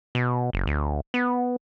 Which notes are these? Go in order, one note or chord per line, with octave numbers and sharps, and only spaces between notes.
B2
F#1
D2
B3